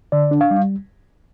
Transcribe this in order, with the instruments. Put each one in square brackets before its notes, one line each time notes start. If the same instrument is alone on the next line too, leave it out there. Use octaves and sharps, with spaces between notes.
[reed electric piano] D3 D5
D4
F5
G3